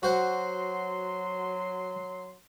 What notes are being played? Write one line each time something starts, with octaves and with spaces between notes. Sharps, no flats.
F#3 F#4 C5 F#5 C6